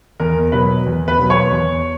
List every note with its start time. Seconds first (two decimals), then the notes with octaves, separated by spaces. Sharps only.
0.20 E2 A#4
0.52 B2 F#3 B4
0.86 E2
1.08 B4
1.19 B2 F#3
1.30 C#5
1.51 E2